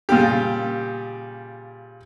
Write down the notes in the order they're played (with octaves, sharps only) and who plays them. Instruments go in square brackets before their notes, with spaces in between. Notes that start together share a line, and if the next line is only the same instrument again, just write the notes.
[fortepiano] A#2 C#3 G3 G4